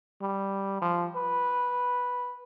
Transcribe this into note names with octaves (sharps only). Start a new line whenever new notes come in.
G3
F3
B4